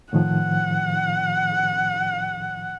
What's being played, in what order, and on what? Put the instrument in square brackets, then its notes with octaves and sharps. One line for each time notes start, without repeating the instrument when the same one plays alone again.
[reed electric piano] A2 D#3 F3 [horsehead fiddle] F#5